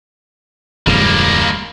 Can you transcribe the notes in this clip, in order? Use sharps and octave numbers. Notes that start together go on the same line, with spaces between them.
D1 F2 G3 G#3 A#3